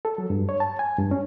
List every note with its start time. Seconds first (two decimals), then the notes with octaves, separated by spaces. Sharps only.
0.05 A4
0.18 F#3
0.30 G2
0.49 C#5
0.60 A5
0.79 G#5
0.98 G2
1.11 C#4